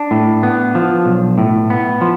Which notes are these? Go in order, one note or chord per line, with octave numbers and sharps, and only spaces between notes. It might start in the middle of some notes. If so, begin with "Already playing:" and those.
Already playing: D4
A2
B3
F3
B1
A2
B3
F3